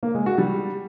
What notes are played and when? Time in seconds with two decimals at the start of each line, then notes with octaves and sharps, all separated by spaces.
0.03 A#3
0.14 G#3
0.26 F#4
0.38 G3